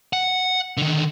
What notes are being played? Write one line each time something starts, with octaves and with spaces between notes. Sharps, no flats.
F#5
D3 D#3